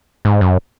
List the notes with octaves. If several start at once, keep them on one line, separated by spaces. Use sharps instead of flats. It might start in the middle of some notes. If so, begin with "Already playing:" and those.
G#2
F#2